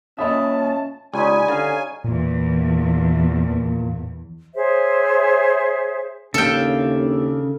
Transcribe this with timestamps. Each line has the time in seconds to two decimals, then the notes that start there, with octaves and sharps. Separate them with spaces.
0.19 A#2 C#4 D#5 E5 A5 B5 D#6
1.14 C#2 G3 C#4 D#4 G#5 B5
1.48 D3 F5
2.04 E2 A#2
4.55 G#4 C5 C#5 E5
6.34 D#2 C#3 D4 A4 E5 F5 G5